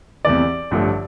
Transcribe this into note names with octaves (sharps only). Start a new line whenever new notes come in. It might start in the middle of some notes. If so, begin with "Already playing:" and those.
E2 C3 E3 A3 D5
A1 G2 D3 F3 A3